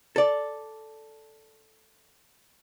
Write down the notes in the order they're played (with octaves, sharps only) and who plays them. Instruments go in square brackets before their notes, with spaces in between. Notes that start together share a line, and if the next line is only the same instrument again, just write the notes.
[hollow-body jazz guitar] A4 D5